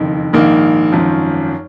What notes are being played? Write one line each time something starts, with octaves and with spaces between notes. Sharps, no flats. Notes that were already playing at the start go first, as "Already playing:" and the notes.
Already playing: F#1 F2 D#3
A#1 G#2 D#3 A#3
G#1 F#2 F3